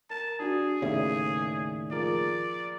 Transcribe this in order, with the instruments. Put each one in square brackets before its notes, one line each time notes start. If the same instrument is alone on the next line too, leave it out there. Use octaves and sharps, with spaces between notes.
[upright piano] A#4 [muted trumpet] A5
[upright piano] D4 F#4 [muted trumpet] G#4
[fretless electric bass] D#2 A2 C#3 [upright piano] D5 E5
[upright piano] F3 G#4 A#4 [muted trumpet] D5